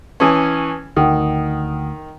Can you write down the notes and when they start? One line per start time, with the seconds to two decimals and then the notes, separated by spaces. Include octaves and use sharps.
0.20 E3 C#4 B4 A5 D#6
0.97 D2 D#3 F#5 G5 D#6